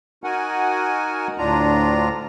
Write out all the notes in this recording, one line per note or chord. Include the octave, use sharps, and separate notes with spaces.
D#4 F#4 A#4 F#5 G#5
D2 A2 D4 F4 A#5